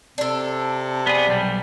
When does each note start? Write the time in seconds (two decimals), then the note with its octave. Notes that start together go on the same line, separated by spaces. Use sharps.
0.18 C3 D4 A4
1.07 B3 G#4 D5
1.27 B1 G3